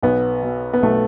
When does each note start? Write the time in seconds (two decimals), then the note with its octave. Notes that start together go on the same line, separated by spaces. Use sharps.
0.03 B1 B3
0.43 B2
0.73 B3
0.82 B1 A3